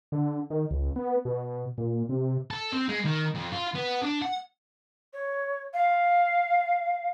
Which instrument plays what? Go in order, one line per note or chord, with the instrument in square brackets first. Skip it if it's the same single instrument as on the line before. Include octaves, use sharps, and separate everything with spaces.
[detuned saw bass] D3
D#3
C#2
B3
B2
A#2
C3
[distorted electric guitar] A4
C4
G#3
D#3
F2
F4
B3
D4
F#5
[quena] C#5
F5